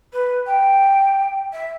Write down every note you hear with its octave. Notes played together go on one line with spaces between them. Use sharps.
B4
G5
E5